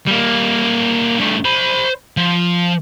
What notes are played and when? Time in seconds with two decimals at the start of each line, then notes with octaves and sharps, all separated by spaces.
0.07 G3 A#3
1.18 G2 A3
1.45 C5 B5
2.17 F3